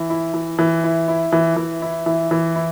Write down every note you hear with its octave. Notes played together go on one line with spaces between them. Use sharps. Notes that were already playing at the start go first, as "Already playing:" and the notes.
Already playing: E3
E4
E3
E3
E4
E4
E3
E3
E4
E3
E3
E4